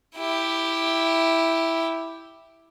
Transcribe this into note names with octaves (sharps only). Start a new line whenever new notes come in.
E4 G4